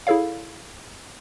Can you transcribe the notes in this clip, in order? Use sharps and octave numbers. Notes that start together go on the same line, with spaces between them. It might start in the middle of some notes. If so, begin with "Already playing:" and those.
E4 G#4 A4 C#5 F5